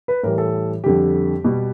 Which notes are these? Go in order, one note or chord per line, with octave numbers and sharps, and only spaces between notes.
B4
A2 E3 G3 A#4
A4
F2 D3 G3 G4
B2 G3